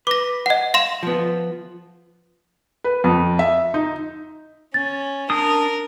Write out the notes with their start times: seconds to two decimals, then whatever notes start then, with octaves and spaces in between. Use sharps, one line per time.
0.07 B4 D6 A#6
0.46 D#5 F#5
0.74 F5 C6 E7
1.03 F3 B3
2.84 B4
3.04 F2
3.39 E5
3.74 D#4
4.74 C#4 A6
5.30 D4 A#4 D#6